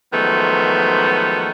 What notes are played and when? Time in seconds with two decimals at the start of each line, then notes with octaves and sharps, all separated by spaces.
0.13 D#3 F3 F#3 G#3 A3 B3